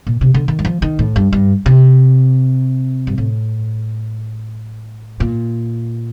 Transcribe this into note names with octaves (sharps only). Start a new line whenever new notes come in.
A#2
C3
D3
D#3
G3
F3
D#3
A2
G2
G2
C3
G2
A2
A#2